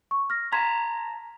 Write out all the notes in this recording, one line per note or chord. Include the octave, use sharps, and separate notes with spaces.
C#6
F6 A#6
A5 A#5 C6 G#6 B6